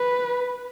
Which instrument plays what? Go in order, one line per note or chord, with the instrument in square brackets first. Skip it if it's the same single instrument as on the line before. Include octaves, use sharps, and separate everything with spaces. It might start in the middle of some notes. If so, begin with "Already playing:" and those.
Already playing: [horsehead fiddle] B4